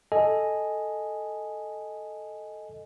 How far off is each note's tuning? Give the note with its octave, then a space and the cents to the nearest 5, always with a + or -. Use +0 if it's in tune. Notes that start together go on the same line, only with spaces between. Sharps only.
A4 +0 D#5 +0 G#5 +0